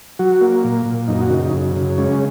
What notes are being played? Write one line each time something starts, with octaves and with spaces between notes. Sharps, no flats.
F#3 F#4
A#3
A#2
A#2
F#2 D#4
F#4
C#3 D#4
F#2
C#3
G#3 C#4